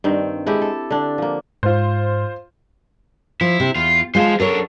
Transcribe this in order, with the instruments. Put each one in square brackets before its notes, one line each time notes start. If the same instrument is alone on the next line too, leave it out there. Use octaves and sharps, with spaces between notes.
[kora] G2 D#3 C4
G#3 E4 G4 A4
A4
D3 D4
F3 A#3
[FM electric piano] G#2 [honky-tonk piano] F4 C5
[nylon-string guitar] F3 [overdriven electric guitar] E4
[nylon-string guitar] C3
[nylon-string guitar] E2 [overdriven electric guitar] F4
[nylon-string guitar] G#3 F4 [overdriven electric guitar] C5 A5
[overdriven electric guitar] F#2 D4 [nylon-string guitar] A4 A#4 C#5